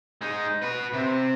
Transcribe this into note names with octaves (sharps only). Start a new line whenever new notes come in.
G#3 D#4
F#4 B4
C3